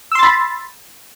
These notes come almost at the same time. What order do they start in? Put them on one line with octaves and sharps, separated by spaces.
E6 C6 A6 B5